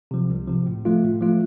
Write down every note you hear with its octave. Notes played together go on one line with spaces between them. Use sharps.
C3 F3
C2
C3 F3
A2
F3 A3 F4
A2
F3 A3 F4